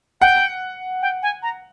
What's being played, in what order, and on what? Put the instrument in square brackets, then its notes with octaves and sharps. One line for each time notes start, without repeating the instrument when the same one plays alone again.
[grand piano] F#5 [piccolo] G5
[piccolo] G5
G#5
A#5